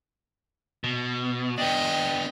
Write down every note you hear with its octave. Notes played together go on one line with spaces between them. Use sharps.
B2
B3 D4 D#5 G5